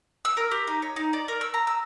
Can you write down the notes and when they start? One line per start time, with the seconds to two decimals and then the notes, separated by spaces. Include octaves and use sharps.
0.25 E6
0.37 A#4
0.51 G4
0.67 D#4
0.82 C#5
0.96 D#4
1.13 D5
1.28 A#4
1.41 E6
1.54 A#5
1.67 E6